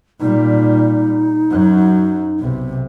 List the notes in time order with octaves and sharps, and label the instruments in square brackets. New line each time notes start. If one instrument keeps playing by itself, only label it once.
[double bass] A#2 G3 [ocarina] D#4
[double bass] F#2 F#3
B1 C3